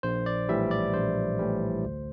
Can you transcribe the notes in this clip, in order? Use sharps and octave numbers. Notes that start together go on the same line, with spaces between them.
A#1 C5
D5
A2 E3 G3 E5
D5
A#1 C5
A2 E3 G3
D2